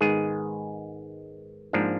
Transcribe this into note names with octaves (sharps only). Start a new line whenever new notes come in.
G#2 D#3 G#3 B3 G#4
G#2 F3 A#3 D4